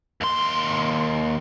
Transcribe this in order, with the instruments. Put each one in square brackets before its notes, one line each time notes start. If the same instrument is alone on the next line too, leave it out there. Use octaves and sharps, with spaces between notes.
[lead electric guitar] D#2 C6